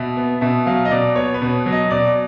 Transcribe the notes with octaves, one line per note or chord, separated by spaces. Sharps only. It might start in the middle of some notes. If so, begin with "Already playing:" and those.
Already playing: B2 E5
B3
B2 E5
F#3 F5
D#5
B2 D5
B3 C#5
B4
B2
F#3
D#5
B2 D5